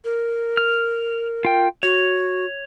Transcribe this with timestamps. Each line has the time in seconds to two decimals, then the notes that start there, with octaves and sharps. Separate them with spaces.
0.05 A#4
0.57 F6
1.45 F4 G5
1.83 F#4 C#5